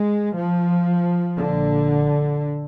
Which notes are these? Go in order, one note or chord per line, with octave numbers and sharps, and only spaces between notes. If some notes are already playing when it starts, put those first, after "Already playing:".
Already playing: G#3
F3
A#1 A#2 D3